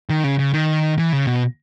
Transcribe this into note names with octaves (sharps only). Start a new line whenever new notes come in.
D#3
C#3
C#3
D#3
E3
C#3
B2